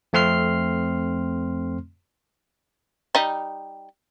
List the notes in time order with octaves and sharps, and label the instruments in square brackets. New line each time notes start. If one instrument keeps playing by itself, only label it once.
[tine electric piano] F2 A3 C4 C6 F6 C7
[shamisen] G3 D#4